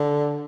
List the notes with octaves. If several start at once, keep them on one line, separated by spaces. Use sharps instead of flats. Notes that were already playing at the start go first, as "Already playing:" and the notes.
Already playing: D3